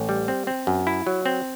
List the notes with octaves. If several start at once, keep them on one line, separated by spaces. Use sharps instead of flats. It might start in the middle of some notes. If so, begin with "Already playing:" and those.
Already playing: A1
G3
C4
C4
F#2
E4
F#3
C4